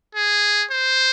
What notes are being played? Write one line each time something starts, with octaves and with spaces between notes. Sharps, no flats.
G#4
C5